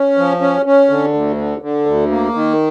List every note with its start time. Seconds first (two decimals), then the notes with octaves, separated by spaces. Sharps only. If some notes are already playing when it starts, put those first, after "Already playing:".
Already playing: C#4
0.17 F3
0.41 C#4
0.66 C#4
0.89 D3
1.14 D2
1.38 D3
1.62 D3
1.86 D2
2.10 A#3
2.34 D#3